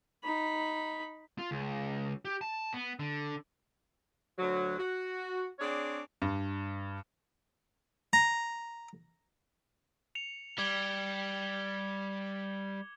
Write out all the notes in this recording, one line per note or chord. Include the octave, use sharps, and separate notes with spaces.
D#4 B5
F4
C#2
G4
A5
B3
D3
D2 F#3
F#4
C4 D4 G#4 C#5 D5
G2
A#5
C#7 F7
G3 D6 G#6 G7